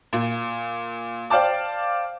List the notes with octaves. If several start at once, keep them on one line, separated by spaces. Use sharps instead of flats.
A#2
C5 D5 F5 G5 A5 D6